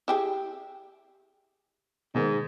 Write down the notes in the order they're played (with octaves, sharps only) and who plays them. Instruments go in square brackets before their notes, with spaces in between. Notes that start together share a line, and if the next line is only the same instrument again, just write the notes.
[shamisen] E4 G4 G#4
[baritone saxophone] G#2 [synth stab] B2 D#3